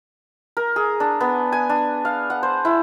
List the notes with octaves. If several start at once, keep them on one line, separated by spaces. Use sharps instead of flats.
A#4
G#4
D4
B3
G#5
D4
F5
F#5
C5
E4